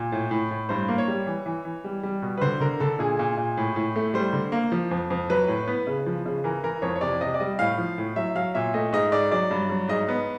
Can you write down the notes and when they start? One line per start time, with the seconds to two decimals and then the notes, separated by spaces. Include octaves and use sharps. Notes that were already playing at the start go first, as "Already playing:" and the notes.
Already playing: A#2
0.12 A2
0.31 A2
0.51 A2
0.69 G2 C5
0.88 A#3
0.98 C#5
1.08 G3
1.27 E3
1.46 E3
1.65 E3
1.84 G3
2.03 G3
2.22 B2
2.38 B4
2.41 D3 C5
2.60 D3 A#4
2.80 D3 A4
2.99 A#2 G#4
3.19 A#2
3.37 A#2
3.57 A2
3.76 A2
3.96 A3
4.14 G3 C5
4.33 D3
4.52 A#3
4.72 F3
4.91 F2
5.10 F2
5.30 F#3 B4
5.48 A2
5.67 B3
5.87 C#3
6.06 F3
6.26 C#3
6.44 E3 A#4
6.63 E3 A#4
6.82 F2 C#5
6.96 C#5
7.01 C3 D5
7.21 C3 D#5
7.34 D5
7.40 G3 D#5
7.59 A2 F5
7.78 F3
7.98 A2
8.16 F#3 E5
8.35 F#3 F5
8.55 A#2 E5
8.74 A3 D#5
8.93 G#2 D#5
9.12 G#2 D5
9.31 F#3 D5
9.51 G2
9.70 F#3
9.88 G#2 D#5
10.08 B3